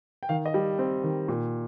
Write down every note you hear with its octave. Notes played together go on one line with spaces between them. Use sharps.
G5
D#3 F5
D#5
G3
C4
D#3
A#2